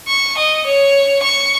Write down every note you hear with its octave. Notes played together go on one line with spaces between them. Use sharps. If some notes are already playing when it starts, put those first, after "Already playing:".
C#6
D#5
C#5
C#6